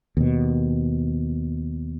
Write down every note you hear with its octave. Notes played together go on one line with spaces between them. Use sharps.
D#2 B2